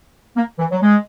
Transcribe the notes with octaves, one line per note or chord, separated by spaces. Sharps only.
A#3
E3
F#3
G#3